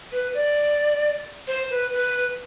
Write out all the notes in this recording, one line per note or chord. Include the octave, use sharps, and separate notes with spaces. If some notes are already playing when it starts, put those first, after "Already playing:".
B4
D5
C5
B4
B4